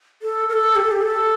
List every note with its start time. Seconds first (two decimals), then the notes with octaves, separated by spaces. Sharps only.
0.22 A4
0.49 A#4
0.53 A4
0.76 G4
0.84 A4
0.92 G4
1.02 A4